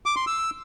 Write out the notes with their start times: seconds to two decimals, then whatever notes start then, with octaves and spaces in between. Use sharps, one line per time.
0.06 D6
0.16 C6
0.27 E6